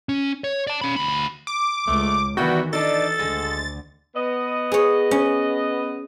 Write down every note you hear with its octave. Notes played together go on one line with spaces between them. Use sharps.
C#4
C#5
D5 A5
C#4 B5
D2 B5
D6
C#2 A3
D#3 E3 G3 B3 E4 F#4 G5
D4 D#4 A4 A6
D2 D3 G#3
B3 D#5
G#4 C#5
C#4